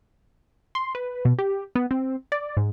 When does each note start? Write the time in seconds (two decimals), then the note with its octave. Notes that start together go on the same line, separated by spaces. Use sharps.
0.75 C6
0.95 B4
1.25 B2
1.39 G4
1.75 B3
1.91 C4
2.32 D5
2.57 G#2